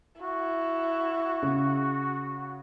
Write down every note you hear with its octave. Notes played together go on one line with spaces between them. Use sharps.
E4 F#4
C#3